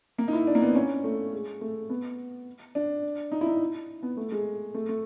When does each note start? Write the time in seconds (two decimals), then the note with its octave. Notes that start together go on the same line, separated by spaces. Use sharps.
0.18 A#3
0.28 D#4
0.33 E4
0.47 D4
0.55 A#3
0.62 B3
0.68 C4
0.75 C#4
1.04 A3
1.33 G#3
1.61 A3
1.90 B3
2.75 D4
3.32 D#4
3.41 E4
3.46 D#4
4.03 B3
4.17 A3
4.32 G#3
4.74 A3
4.89 A3